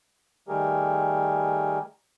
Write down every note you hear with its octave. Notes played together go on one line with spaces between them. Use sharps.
D#3 G3 A3 G4 G#4 A#4